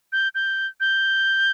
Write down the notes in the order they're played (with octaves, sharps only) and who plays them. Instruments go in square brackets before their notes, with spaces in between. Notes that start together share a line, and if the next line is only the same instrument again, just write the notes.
[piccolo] G6
G6
G6